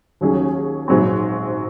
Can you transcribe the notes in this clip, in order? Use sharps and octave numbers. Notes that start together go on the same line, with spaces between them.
D#2 D#3 F#3 C#4 G#4
A#1 G#2 F#3 C4